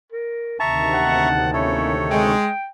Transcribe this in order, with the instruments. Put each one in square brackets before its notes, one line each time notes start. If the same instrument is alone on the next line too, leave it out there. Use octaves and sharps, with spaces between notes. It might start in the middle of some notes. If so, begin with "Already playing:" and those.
[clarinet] A#4
[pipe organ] D2 C3 D#3 [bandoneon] E5 A#5 C#6 [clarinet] A5
[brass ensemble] A1 D#2 F#5
[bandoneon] A3 A4 C#5 [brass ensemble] A#3 C#4 E4
[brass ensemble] G#3 [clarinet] G5